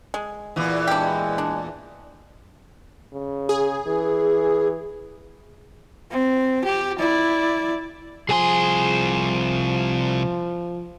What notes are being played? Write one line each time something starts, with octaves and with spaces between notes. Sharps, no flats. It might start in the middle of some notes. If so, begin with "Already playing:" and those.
G#3
E2 A#2 E3
G#3 D4 G4
D4
C#3
G#4
E3
C4
G4
E4 D5
C2 F3 G#4 G#5 C6